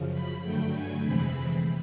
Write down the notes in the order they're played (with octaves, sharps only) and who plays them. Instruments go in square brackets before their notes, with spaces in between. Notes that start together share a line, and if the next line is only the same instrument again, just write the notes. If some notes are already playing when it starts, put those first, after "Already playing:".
Already playing: [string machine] F#2 C#3 F3
B5
G2 D3 F#3 A3 G5
G#5
F2 C3 E3 G#3 C4 B5